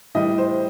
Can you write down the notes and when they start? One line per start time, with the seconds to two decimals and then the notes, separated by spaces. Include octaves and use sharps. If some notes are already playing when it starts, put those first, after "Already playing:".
0.14 A2 E3 G3 D#5
0.38 C5